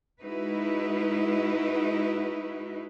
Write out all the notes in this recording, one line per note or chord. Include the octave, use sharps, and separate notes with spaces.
G#3 D#4 E4 F#4 B4